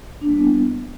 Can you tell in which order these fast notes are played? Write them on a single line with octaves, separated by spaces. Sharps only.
D4 A#3 G3 E4 B3